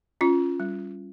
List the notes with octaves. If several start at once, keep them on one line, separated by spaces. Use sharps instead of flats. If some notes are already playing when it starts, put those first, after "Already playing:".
C#4 F4
G3